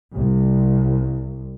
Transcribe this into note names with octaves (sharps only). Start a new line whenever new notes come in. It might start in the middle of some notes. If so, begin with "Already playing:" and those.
C2